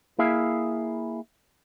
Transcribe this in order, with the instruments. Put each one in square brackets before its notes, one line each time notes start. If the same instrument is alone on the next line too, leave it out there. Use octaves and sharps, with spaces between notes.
[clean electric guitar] A#3 E4 G#4 E5 F5